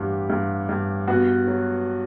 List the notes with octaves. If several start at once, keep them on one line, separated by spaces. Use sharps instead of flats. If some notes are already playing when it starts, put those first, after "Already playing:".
Already playing: A1 G2 G4
G2
G2
B3 F#4
F#3